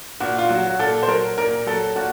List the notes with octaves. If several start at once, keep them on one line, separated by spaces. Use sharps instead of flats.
A#2 F#4
F4
F#3 F#4
F#4
A#2 A4
C5
F#3 A#4
A#2 A#4
F#3 A4
A#2 F#4